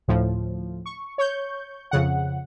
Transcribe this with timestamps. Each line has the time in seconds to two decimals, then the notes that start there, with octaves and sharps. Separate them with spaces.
0.08 D2 A2 F3
0.86 C#6
1.18 C#5 C#6 G6
1.91 F2 C#3 F#5